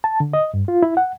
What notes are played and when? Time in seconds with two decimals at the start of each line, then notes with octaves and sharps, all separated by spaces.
0.04 A5
0.20 D3
0.33 D#5
0.54 G2
0.68 F4
0.83 E4
0.97 F#5